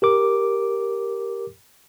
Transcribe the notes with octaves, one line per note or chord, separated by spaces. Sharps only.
G4 A#4 D6